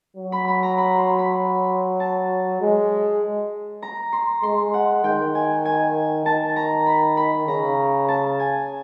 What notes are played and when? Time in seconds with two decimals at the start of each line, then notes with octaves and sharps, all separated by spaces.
0.17 F#3
0.32 B5
0.48 B5
0.63 A#5
0.78 B5
0.98 C6
1.19 B5
2.00 A5
2.61 G#3
3.82 A#5
4.13 C6
4.43 G#3 C6
4.74 F#5
5.04 D#3 G5
5.35 G#5
5.65 G#5
6.26 D#3 A5
6.56 A#5
6.86 B5
7.17 B5
7.47 C#3 A#5
8.08 A5
8.39 G#5